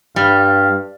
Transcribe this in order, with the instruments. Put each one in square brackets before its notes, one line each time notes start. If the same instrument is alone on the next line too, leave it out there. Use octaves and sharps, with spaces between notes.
[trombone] G2 [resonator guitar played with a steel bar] G3 [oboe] F5